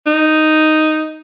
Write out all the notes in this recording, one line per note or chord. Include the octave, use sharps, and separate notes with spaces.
D#4